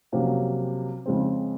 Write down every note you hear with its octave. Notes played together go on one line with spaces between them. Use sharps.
F2 C3 F#3 A#3 C#4
F2 C#3 G#3 C4